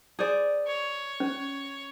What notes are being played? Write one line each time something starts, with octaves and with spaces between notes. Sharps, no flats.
G#4 C5 D5
C#5
C#4